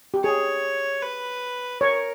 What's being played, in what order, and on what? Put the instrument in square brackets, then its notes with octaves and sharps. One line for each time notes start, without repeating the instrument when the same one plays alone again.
[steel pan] G4
[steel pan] G#4 [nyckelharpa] C#5
[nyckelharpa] B4
[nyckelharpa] A#4 [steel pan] C#5